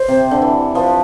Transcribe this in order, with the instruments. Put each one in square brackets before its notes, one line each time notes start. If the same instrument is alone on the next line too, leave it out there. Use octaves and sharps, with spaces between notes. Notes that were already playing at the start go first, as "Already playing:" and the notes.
Already playing: [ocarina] C5
[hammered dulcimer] C3
D3
E3
[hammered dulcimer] F3 [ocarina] B4